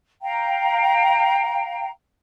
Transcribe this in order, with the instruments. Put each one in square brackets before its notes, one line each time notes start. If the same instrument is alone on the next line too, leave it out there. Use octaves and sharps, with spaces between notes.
[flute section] F5 G5 A#5